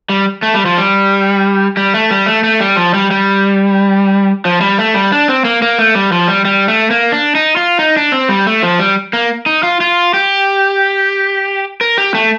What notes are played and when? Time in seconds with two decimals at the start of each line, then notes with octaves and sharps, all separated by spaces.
0.09 G3
0.42 A3
0.54 G3
0.66 F3
0.78 G3
1.77 G3
1.94 A3
2.11 G3
2.26 A3
2.44 A3
2.60 G3
2.77 F3
2.94 G3
3.11 G3
4.45 F3
4.61 G3
4.79 A3
4.94 G3
5.12 D4
5.28 C4
5.45 A#3
5.62 A#3
5.79 A3
5.95 G3
6.12 F3
6.28 G3
6.45 G3
6.68 A3
6.90 A#3
7.12 D4
7.35 D#4
7.56 F4
7.79 D#4
7.96 D4
8.12 C4
8.29 G3
8.47 A3
8.63 F3
8.79 G3
9.13 A#3
9.46 D#4
9.63 F4
9.81 F4
10.14 G4
11.81 A#4
11.98 G4
12.14 A3